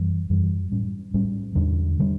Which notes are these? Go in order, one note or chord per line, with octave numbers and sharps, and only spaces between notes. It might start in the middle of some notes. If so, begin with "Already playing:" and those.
Already playing: F#2 E3 G3
F#2 E3 G3
A2 G3 C#4
A2 G3 C#4
E2 D3 G3 D4
D3 G3 D4